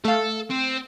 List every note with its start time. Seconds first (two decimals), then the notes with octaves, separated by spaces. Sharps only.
0.05 A3 A4 F5
0.50 C4